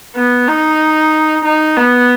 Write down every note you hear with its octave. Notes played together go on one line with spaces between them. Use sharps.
B3
D#4
D#4
B3